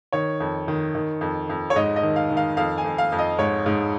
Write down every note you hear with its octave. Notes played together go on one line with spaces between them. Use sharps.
D#3 C#5
F2
D#3
D#3
F2
F2
C#5
G#2 D#5
D#5
D#3
F5
D#3
F5
F2 F5
G#5
F2
F5
F2
D#5
G#2 C#5
G#2